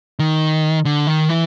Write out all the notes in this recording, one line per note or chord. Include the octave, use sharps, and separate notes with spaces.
D#3
D3
D#3
E3